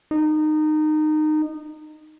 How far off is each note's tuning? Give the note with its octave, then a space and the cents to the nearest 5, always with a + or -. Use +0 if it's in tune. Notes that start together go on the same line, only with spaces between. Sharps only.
D#4 -20